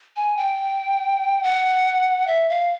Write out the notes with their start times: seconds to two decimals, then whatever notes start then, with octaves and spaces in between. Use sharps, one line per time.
0.16 G#5
0.37 G5
1.43 F#5
2.27 E5
2.49 F5